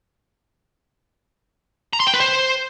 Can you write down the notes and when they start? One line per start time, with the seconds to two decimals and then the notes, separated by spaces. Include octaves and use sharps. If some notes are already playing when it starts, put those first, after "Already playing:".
1.93 A#5
2.00 C6
2.07 G5
2.13 B4
2.20 C5